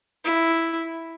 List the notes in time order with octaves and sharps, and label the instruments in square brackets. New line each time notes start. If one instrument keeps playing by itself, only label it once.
[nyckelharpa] E4